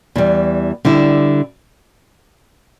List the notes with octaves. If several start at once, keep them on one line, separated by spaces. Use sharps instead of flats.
E2 E3 G3
D3 G3 E4